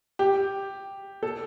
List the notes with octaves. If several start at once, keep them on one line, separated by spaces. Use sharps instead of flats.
G4
A4